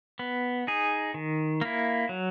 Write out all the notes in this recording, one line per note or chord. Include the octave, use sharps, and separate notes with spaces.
B3
D#4 G#4
D#3
A#3 E4
F#3